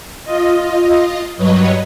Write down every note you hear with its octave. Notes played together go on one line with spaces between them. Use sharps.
F4 D#5
G2 F#3 B4 C#5 D#5